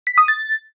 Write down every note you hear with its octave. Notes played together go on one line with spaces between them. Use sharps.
B6
D#6
A6